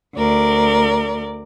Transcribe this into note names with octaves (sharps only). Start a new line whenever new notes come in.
D2 A#4 D5